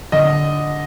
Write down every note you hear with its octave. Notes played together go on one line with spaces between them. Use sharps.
D3 D#5